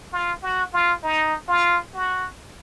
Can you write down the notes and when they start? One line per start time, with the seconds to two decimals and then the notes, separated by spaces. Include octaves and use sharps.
0.13 F4
0.43 F#4
0.73 F4
1.03 D#4
1.48 F4
1.94 F#4